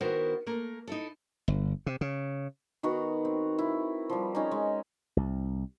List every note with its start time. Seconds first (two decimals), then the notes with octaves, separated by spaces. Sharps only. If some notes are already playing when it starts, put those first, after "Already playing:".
0.01 D#3 B3 E4 F#4 A#4 C5
0.46 A3 A#3 A#4
0.87 D#4 E4 A4
1.48 G1
1.86 C3
2.01 C#3
2.83 D#3 B3 F#4 A#4
3.25 C4
3.59 E4
4.10 F3 G3
4.35 C#4 D#4 G#4 A#5
4.51 G#3
5.17 C2